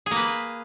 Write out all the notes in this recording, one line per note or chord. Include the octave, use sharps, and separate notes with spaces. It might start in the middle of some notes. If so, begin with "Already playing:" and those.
A#3 G#4 B4